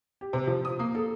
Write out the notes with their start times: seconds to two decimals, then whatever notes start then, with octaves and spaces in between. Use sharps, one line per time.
0.21 G4
0.33 C3
0.47 F3
0.65 D#6
0.79 A#3
0.95 A4